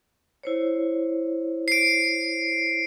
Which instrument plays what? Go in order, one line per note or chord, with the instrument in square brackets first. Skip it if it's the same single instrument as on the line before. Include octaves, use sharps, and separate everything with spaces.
[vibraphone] E4 C5 C#5
[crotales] C7 D7